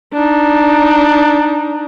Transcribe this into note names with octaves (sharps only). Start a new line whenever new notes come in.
D4 D#4